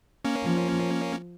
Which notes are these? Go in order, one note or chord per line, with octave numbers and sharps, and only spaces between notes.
A#3 C#4
F3